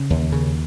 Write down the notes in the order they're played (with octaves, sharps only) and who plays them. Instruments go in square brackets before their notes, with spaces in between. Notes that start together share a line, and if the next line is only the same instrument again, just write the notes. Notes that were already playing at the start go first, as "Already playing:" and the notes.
Already playing: [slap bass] C#3
D#2
C#3